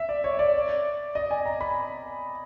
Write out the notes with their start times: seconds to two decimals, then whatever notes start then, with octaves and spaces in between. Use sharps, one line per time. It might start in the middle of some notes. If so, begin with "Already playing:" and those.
Already playing: E5
0.09 D5
0.24 C#5
0.39 D5
1.15 D#5
1.31 G#5
1.46 A#5
1.61 B5